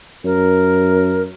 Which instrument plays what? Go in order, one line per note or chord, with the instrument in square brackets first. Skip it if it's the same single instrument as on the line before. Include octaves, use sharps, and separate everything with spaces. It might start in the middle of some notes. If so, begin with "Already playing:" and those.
[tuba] F#2 [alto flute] A#4